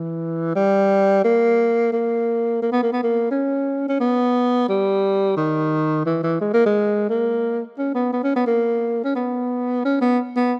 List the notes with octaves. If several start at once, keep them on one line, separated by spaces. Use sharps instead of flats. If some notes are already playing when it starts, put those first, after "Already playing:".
Already playing: E3
G3
A#3
A#3
A#3
B3
A#3
B3
A#3
C#4
C#4
B3
G3
D#3
E3
E3
G#3
A#3
G#3
A#3
C#4
B3
B3
C#4
B3
A#3
C#4
B3
C#4
B3
B3